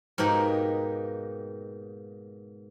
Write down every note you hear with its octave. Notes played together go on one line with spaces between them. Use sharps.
G#2 B2 A#3 D#4 G4